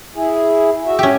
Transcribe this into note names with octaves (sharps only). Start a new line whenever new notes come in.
E4 G#4
F#4 E5
C#4 G4